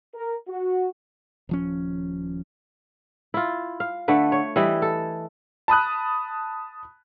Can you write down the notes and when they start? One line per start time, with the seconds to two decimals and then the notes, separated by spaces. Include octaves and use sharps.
0.14 A#4
0.48 F#4
1.49 D#1 F3 C#4
3.34 E4 F4
3.80 F5
4.08 D3 A3 B4
4.32 C#5
4.56 E3 G3 E4 D#5
4.82 A4
5.68 A5 B5 D#6 F#6